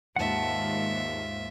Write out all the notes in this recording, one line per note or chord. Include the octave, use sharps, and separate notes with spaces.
D#2 G#2 F4 E5 F#5 A5